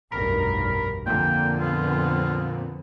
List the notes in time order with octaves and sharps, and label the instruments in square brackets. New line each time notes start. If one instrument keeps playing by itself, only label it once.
[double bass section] F1 B1 G2 [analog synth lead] A#4 [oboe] B5
[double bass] F2 D3 [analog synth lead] A#2 [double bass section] A#3 [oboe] G5
[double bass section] B3 C4 [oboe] F4